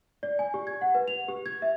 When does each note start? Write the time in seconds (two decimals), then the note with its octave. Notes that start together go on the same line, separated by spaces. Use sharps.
0.23 D5
0.39 G#5
0.54 G4
0.67 G#6
0.81 F#5
0.95 B4
1.08 F7
1.29 G4
1.46 G#6
1.62 E5